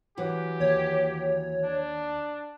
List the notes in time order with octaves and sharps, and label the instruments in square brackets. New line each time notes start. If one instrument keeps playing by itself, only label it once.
[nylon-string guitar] E3 F#3 [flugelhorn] G4
[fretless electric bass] D#2 [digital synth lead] C#5
[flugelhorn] D4